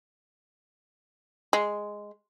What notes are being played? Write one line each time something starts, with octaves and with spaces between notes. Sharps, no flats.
G#3